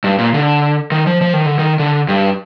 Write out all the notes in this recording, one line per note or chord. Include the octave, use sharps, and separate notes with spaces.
G2
A#2
D3
D#3
F3
F3
D#3
D3
D#3
D3
G2